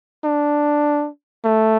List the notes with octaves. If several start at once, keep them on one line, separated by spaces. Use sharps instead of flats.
D4
A3